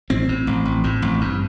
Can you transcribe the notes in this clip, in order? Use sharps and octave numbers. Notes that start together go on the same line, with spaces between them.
A1 C4
A2
A1
A1
A2
A1
G2